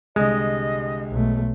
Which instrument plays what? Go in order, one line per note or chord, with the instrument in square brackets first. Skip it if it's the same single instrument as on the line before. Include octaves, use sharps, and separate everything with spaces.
[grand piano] C2 D3 G3 [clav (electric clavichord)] G#3 [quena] D#5
[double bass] B1 A3